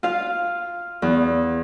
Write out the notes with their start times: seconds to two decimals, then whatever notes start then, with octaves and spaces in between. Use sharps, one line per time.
0.03 F4 F5
1.02 E2